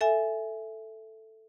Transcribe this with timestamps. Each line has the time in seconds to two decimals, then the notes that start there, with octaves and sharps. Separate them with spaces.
0.01 A4 E5 G#5